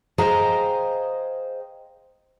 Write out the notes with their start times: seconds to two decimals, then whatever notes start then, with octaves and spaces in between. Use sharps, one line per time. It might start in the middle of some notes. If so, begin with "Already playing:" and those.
0.18 G#4 C5 D#5 F5 G5 A#5